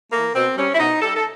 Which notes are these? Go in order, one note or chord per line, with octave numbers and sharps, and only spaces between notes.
E3 A3 A#3
B2 C4
G3 C#4
E4
B2 D#4
G3 A4
A4